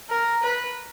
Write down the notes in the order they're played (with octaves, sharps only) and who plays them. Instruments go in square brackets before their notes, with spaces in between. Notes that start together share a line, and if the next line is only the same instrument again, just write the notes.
[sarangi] A#4
B4